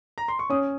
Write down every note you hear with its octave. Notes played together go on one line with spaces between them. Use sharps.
A#5
C6
C#6
C#4 D#6